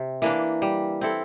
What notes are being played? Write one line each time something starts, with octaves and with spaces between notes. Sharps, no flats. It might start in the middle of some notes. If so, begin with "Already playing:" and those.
Already playing: C3
E3 A#3 D4
G3
C4 E4 A4